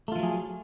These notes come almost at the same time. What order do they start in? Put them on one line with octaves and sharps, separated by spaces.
A3 F4 F3 F#3 G#4